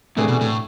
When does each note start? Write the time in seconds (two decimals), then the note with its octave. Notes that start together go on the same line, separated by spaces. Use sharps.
0.16 A2 C3 E3 A3 D4 G#4
0.28 B2
0.41 A2